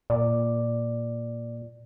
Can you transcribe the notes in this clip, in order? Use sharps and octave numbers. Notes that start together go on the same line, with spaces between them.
A#2 D5